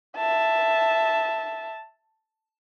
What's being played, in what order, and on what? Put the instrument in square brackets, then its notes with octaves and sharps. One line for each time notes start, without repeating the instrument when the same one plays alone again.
[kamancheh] E5 A5